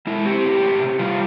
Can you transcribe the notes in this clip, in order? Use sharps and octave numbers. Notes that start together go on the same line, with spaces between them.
G#3 E4
C4 G4
A2
A2
C3
G3 F4